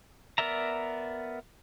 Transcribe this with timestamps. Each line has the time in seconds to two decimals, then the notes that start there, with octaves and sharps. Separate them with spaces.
0.38 B3 A#4 D5 E5 A#5